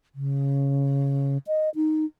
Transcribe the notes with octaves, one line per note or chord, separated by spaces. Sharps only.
C#3
D#5
D#4